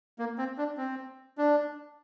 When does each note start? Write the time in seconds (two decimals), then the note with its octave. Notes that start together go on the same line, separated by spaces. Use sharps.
0.19 A#3
0.38 C4
0.58 D4
0.77 C4
1.38 D4